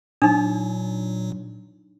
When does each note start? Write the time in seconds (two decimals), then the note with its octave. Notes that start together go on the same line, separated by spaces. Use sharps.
0.22 A#2 F#3 D4 D#4